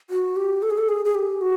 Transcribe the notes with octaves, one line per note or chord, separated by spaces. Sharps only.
F#4
G4
A4
G#4
A4
G#4
G#4
G4
F#4